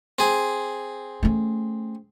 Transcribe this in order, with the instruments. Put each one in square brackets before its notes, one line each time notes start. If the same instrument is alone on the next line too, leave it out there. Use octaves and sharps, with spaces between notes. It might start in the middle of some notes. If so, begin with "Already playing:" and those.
[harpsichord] C4 G#4
[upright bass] A3 C#4